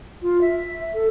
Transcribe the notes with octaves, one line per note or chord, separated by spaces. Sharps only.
F4
E5
A4